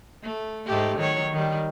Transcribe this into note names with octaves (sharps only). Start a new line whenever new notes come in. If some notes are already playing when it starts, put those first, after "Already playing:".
A3
G#2 A3 G4
D#3 F#3 C#5
D#3 G3